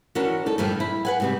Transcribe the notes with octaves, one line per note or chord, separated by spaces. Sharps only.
E3 C#4 D4 F#4 A#4
D#4 A4
G2 A#2 D3 F3 F4
E4
B4 F#5 G#5
G#2 C3 G3